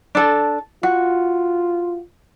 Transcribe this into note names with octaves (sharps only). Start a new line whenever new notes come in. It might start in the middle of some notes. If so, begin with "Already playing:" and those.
D4 A4
F4 F#4